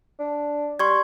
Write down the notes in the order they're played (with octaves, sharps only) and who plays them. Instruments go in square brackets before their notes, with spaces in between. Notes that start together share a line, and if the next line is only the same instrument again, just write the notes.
[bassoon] D4
[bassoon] G3 [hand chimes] C6 C#6 G#6